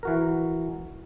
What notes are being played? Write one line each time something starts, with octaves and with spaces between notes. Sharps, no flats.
E3 F#4 A#4